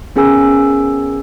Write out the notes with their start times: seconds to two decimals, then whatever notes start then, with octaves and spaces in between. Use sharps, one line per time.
0.16 B3 C#4 G#4 A#4 G#5 E6